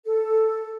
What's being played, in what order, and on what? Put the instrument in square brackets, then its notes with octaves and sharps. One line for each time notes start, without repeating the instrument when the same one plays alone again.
[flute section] A4